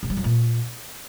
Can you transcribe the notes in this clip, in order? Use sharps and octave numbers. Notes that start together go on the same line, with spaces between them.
C3
G3
F2
A#2